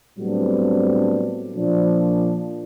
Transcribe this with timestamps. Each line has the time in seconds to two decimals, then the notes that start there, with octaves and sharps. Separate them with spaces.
0.18 A2 F#3 G3 B3 C4 D4
1.55 A#2 F3 D4